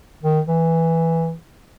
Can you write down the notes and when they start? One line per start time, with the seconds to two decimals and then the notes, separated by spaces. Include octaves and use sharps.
0.23 D#3
0.48 E3